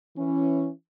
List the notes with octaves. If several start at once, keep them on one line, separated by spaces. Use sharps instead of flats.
E3 C#4